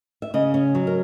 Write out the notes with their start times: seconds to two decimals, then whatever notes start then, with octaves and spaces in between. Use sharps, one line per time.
0.22 E5
0.34 C#3 D#5
0.54 C#4
0.75 F#3
0.87 A#4